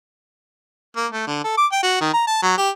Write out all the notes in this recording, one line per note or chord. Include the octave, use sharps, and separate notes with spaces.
A#3
A3
D3
A4
D6
G5
F#4
D#3
A#5
A5
F#3
G4